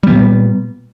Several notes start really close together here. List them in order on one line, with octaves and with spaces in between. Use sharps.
G3 B3 A#2